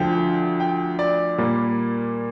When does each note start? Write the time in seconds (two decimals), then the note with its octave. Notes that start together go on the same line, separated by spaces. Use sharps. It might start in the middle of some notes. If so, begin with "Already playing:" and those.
Already playing: D2 D3 F3 G5
0.60 G5
0.99 D5
1.38 A#2 G3 A#3